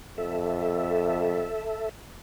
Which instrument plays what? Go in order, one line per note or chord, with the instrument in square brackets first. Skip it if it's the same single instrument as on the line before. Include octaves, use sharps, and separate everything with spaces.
[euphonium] F2 [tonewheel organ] A4 E5